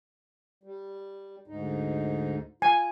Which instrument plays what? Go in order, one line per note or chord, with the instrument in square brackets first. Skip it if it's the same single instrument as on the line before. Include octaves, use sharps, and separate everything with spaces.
[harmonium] G3
D2 G#2 D#4
[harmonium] F4 [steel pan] G#5